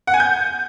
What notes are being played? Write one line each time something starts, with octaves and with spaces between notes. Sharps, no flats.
F#5
G#5
G6